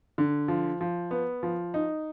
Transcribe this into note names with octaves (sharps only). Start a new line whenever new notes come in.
D3
F3
F3
B3
F3
D#4